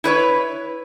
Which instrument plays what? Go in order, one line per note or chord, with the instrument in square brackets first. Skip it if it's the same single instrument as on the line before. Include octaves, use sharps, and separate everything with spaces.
[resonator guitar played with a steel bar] E4 B4 C#5